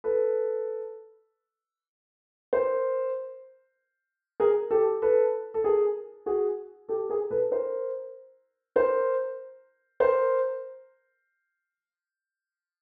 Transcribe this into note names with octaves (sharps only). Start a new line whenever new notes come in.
A4 B4
A#4 C5
G#4 A#4
G4 A4
A4 B4
A4
G#4 A#4
F#4 G#4
G4 A4
G#4 A#4
A4 B4
A#4 C5
A#4 C5
A#4 C5